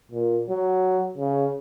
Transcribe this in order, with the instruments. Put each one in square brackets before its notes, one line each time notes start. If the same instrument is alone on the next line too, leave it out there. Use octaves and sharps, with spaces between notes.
[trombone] A#2
F#3
C#3